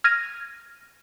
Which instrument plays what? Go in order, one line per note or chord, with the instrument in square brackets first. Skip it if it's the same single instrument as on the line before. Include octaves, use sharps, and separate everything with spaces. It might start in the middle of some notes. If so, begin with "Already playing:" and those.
[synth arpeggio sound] F6 G#6 A#6 D#7